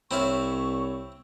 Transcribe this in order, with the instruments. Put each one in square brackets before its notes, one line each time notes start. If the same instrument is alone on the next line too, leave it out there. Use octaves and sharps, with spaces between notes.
[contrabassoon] C2 [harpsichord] C4 E4 F5 [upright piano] C#5 B5 [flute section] C#6